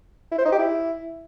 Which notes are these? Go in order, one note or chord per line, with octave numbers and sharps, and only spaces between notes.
E4
C5
D#4
G4
E4